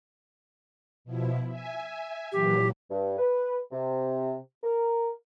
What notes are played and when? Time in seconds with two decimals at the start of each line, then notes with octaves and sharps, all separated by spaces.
1.05 B2 F3 E4
1.47 E5 G#5
2.32 A#2 E3 F#3 G4
2.90 G2
3.17 B4
3.71 C3
4.63 A#4